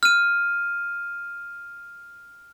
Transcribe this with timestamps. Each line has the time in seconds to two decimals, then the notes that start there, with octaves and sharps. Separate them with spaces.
0.03 F6 D#7